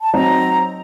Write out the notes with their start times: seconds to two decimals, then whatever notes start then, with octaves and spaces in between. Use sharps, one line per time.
0.03 A5
0.13 F#3 C4 D#4 A#5